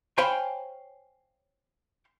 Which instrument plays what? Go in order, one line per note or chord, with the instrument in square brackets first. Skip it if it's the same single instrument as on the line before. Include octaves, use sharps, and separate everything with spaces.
[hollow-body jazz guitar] C5 C#5 F5 G5 G#5 B5